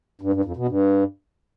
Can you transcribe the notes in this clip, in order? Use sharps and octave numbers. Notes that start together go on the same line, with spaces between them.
G2
G2
F2
B2
G2